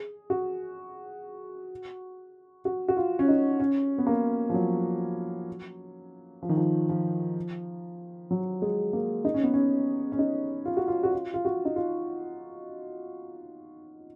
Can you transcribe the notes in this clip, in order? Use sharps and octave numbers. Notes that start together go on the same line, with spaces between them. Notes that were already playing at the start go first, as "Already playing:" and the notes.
Already playing: G#4
F#4
F#4
F#4
F4
C#4
D#4
C#4
B3
A#3
F3
F#3
F3
D#3
F3
F3
F#3
G#3
A#3
D#4
C#4
B3
C#4
C#4
D#4
F4
F#4
F4
F#4
F4
F4
F#4
D#4
F4